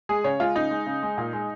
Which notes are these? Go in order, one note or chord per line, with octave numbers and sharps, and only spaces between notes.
G#3 G#4
C#3 C#5
G#3 F4
C#3 D#4
G#3
C#3
G#3
A#2
G#3